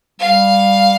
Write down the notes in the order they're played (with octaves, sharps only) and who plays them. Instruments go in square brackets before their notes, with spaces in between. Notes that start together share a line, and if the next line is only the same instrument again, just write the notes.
[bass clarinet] G3 [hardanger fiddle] F5